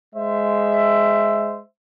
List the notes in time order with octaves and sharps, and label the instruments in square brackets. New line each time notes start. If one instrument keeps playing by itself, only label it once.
[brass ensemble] G#3 C5 E5